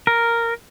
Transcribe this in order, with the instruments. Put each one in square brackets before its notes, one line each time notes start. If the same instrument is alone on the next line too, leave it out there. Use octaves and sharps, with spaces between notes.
[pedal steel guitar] A#4